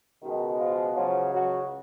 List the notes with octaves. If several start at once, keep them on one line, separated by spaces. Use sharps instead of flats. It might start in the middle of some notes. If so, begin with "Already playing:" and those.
C#2 B2 D#3 G#3 D#4
F3 F4
C#2 C#3 F3 F#3 F4
F#3 F#4